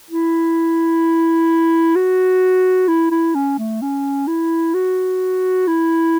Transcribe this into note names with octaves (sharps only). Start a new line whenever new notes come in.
E4
F#4
E4
E4
C#4
A3
C#4
E4
F#4
E4